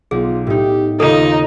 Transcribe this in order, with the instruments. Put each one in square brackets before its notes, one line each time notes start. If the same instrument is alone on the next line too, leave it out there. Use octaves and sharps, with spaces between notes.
[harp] B1 [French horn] F4 [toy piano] G#4
[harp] A2 D#4 [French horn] G4
[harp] D#2 C#3 A#3 [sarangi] D#4 [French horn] F4 [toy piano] A4